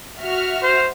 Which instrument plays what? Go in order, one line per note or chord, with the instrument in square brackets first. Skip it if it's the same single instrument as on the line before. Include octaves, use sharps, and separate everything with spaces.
[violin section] F#4 E5 F6
[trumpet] C5